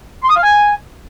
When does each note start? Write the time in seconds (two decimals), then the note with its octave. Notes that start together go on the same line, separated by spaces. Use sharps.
0.23 C6
0.30 D#6
0.36 F5
0.43 G#5